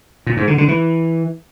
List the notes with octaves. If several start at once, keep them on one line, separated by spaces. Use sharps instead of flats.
A#2
G#2
D3
D3
E3